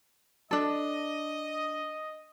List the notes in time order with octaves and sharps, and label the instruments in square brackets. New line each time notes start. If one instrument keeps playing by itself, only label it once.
[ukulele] D4 A4 [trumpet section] D#5